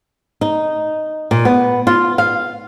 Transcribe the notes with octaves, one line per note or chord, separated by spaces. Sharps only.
D#4
A#2
B3
F4
F5